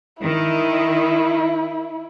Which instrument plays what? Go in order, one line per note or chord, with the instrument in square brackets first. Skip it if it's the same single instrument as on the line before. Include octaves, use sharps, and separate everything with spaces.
[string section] D#3 [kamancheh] E4